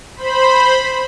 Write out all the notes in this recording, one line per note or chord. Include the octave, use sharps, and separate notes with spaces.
C5 B5